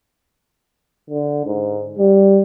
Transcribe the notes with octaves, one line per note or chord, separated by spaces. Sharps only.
D3
G#2
G3